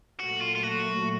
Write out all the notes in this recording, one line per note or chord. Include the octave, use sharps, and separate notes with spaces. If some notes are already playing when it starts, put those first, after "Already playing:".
A#2 F#3 A3 F#4
F4
F4
F#4